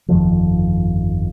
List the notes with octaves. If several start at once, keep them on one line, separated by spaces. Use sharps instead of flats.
G1 F2 D#3 F3